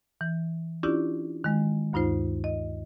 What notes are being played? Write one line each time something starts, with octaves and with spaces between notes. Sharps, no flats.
E3
C#4 D4 E4 F4 G4 D5
D#3 G#3
D2 G2 D#4 F4 C5
D#5